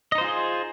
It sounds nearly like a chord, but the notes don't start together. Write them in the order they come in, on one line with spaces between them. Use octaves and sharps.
D#5 D#4 C5 F4 G#4